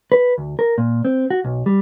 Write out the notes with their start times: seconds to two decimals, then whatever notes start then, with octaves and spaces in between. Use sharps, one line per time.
0.12 B4
0.38 D2
0.59 A#4
0.78 A#2
1.05 C4
1.30 F#4
1.44 B1
1.66 G3